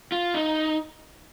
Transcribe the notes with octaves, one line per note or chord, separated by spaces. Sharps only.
F4
D#4